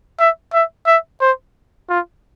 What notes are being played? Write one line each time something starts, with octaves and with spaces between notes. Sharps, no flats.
E5
E5
E5
C5
F4